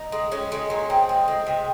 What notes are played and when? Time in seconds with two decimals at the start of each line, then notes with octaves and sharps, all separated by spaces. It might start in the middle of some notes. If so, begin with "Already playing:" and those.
Already playing: D#4
0.12 G#3
0.32 G#3 C#4
0.52 G#3
0.70 A#2
0.90 A#2 C4
1.09 G#3
1.28 G#3
1.47 C3